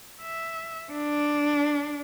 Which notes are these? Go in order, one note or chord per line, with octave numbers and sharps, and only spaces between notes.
E5
D4